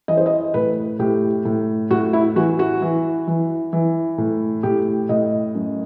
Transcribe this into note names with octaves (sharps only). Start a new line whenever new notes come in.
E3 D#5
C5
D#5
A2 B4
A2 G4
A2
A2 F#4
E4
E3 F#4
F#4
E3
E3
E3
A2
A2 G4
A2 D#5
F#2